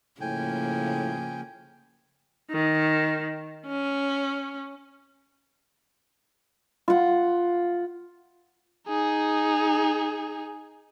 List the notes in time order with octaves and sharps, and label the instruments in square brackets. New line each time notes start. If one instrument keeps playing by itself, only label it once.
[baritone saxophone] A2 [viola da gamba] C#3 F3 A#3 [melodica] G5 G#5
[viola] D#3
C#4
[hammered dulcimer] F4 F#5
[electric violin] D#4 G#4